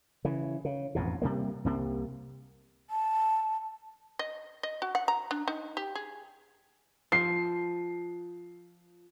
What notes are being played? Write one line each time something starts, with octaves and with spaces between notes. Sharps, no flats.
C#3 E3
C#3
A1 F2 G#2 B2
C3 G3 A#3
C2 C3 A#3
A5
D#5
D#5
F#4
F#5
A#5
D4
D#4
G4
G#4
F3 C7